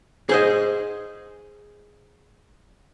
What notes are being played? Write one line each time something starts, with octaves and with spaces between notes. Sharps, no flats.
G#4 C5 D#5